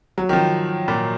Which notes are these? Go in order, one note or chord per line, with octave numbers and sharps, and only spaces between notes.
F#3
D#3
F3
A#2